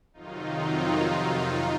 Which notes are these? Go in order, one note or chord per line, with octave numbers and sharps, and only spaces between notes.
F2 C3 D#3 F#3 D#4 F4